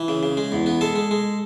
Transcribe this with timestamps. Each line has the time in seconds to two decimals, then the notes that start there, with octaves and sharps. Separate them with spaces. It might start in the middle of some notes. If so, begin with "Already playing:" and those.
Already playing: E3
0.08 C#3
0.23 C#3
0.37 G#3
0.52 E2
0.66 B3
0.81 G#3 A4
0.96 G#3
1.11 G#3